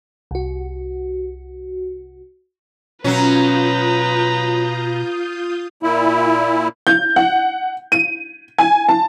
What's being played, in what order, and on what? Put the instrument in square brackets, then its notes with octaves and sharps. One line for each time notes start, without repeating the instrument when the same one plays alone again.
[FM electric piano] C2 F#4
[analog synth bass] B2 [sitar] F#3 C#4 [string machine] F4 D#6 G6 [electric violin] B4 A#5
[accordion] A#2 E4
[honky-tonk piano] G6
F#5
D#7
G#5
A5